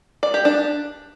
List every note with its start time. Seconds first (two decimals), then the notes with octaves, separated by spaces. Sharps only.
0.23 D5
0.34 G4
0.45 D4